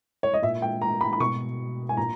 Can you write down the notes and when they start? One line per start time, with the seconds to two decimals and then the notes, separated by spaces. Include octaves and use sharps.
0.23 C#5
0.34 D#5
0.42 A#2 E5
0.62 G5
0.82 A#5
1.01 B5
1.13 B5
1.20 B2 C#6
1.89 G#5
1.97 A#2 A#5